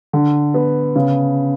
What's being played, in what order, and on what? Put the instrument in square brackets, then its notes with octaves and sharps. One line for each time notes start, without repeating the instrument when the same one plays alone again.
[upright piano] D3
B3
C#3